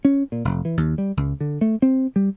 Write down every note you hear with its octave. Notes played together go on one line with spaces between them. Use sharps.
C#4
A#2
F1
E3
D#2
G3
C#2
D3
A3
C4
G3